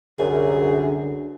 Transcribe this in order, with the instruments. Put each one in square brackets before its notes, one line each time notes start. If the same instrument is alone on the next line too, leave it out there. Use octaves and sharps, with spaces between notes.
[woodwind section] C2 F#2 [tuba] D3 [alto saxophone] G#4